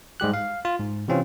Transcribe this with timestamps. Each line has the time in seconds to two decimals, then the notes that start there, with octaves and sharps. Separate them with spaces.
0.20 G#2 G3 G4 F#6
0.34 F5
0.65 F4
0.79 G#2
1.08 C3 E3 C4 C#4 F4